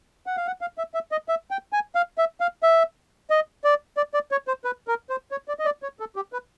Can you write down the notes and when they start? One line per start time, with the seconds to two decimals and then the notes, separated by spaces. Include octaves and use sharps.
0.26 F#5
0.37 F5
0.47 F#5
0.61 F5
0.78 E5
0.94 E5
1.12 D#5
1.28 E5
1.51 G5
1.73 G#5
1.95 F5
2.18 E5
2.40 F5
2.63 E5
3.30 D#5
3.64 D5
3.97 D5
4.14 D5
4.31 C#5
4.48 C5
4.65 B4
4.88 A#4
5.10 C5
5.31 C#5
5.48 D5
5.59 D#5
5.65 D5
5.83 C#5
6.00 A4
6.16 G4
6.33 B4